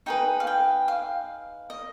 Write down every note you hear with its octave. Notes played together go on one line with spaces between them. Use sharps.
D#4 G#4 B4 G5
F5
G5
F5
D#5